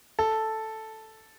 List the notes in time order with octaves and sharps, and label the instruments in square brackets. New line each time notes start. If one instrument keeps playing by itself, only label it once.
[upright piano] A4